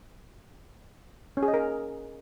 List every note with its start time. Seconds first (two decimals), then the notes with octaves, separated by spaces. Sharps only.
1.37 C#4
1.43 G#4
1.48 D#5
1.54 A#4